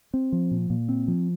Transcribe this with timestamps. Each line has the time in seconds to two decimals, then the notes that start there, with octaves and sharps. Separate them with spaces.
0.14 C4
0.32 F3
0.51 A#2
0.70 A#2
0.89 C4
1.08 F3